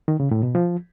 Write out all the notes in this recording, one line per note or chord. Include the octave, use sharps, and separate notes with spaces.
D#3
C#3
A2
B2
F3